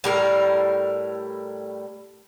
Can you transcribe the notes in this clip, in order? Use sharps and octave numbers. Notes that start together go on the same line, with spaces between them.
A2 G3 A#4